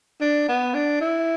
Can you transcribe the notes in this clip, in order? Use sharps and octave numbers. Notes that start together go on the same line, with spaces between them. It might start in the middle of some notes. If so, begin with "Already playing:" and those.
D4
B3
D4
E4